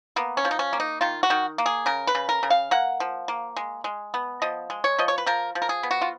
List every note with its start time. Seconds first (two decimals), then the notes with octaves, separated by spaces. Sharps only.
0.16 A#3 B3
0.37 C#4
0.45 F3
0.51 D#4
0.59 C#4
0.73 A#3
0.80 D#4
1.01 D#3 F4
1.23 F#4
1.30 D#3
1.58 A#3
1.66 G#4
1.86 C#3 A#4
2.07 B4
2.15 C#3
2.29 A#4
2.43 C#3
2.50 F5
2.71 A#3 F#5
3.00 F3
3.28 A#3
3.56 G#3
3.84 G#3
4.14 B3
4.42 F3 D#5
4.70 G#3
4.84 C#5
4.98 F3 D#5
5.08 C#5
5.18 B4
5.26 F3 A#4
5.55 F3
5.62 A#4
5.69 G#4
5.83 B3
5.91 F#4
6.02 F4